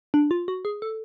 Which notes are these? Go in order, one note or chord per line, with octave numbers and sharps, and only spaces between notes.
D4
F4
F#4
G#4
A4